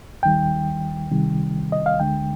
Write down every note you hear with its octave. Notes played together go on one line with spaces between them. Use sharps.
D#2 D#3 G3 G5
C2 C3 D#3 G3
D#5
F5
D2 D3 G#3 G5